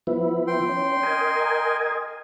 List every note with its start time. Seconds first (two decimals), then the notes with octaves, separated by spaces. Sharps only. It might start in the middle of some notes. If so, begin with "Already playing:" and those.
0.07 F3 B3 E4
0.47 G5 C6
0.69 C#4
1.03 A#4 D#5 G#5